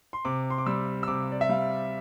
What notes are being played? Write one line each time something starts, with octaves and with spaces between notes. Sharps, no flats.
C6
C3 D6
C6
D6
G3 E6
E6
C3 D6
D5
E5
G3 F5